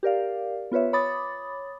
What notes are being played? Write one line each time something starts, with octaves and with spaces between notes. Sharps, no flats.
G4 A#4 D5 F5
B3 F4 B4 C#5 E5
C#5 B5 D6 D#6 A6